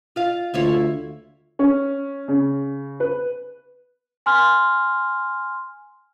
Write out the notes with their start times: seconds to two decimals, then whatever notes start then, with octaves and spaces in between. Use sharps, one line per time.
0.16 F4 F5
0.54 D2 E4 F4 C#5
1.59 C#4
2.28 C#3
3.00 B4
4.26 G#5 C6 F6